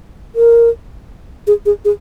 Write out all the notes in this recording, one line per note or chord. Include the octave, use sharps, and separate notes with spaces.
A#4
G#4
G#4
G#4